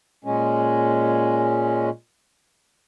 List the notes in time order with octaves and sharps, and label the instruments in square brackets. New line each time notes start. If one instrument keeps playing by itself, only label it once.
[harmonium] A#2 G#3 C#4